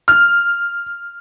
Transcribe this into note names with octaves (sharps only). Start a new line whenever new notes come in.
F6